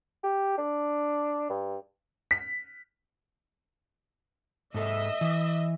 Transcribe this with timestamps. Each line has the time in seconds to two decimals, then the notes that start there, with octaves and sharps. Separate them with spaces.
0.24 G4
0.58 D4
1.50 G2
2.31 B6
4.74 G#2 A4 D#5 E5
5.21 E3